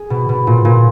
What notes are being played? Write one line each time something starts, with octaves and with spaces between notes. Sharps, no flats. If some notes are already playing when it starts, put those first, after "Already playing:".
Already playing: G#4
B2
B2
A#2
A#2